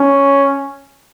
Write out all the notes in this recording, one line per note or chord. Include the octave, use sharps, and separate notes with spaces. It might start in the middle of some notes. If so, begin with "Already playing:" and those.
Already playing: C#4